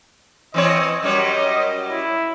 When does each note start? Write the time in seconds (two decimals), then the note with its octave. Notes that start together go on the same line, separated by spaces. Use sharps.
0.54 E3 C4 C#5 D#5
1.03 F#2 G3 C#5 D#5
1.91 E4